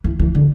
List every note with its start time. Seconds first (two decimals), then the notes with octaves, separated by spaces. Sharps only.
0.04 E3
0.19 E3
0.35 D3